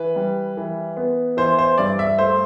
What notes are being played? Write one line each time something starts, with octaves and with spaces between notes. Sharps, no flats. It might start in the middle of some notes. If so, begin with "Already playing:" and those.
Already playing: E3 B4
G3
E3
B3
E3 C5
C5
G2 D5
E5
A3 C5